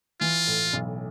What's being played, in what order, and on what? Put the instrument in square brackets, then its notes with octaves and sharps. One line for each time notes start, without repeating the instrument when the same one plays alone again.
[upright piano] E3 [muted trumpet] F4
[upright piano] A2
B1